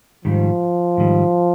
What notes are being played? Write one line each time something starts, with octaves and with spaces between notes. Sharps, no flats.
G#2 D#3 F3 G3
G#2 D#3 G3